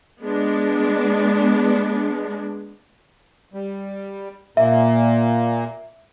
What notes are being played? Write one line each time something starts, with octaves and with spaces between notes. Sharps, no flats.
G#3 B3 D4
G3
A#2 A#3 E5